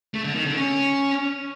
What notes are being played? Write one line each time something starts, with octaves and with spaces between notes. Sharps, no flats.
A3
D3
D#3
D3
C#4